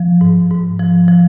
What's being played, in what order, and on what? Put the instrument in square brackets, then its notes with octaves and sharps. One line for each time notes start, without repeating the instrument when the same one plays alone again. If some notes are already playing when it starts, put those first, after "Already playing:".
Already playing: [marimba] F3
G#2
G#2
F3
F3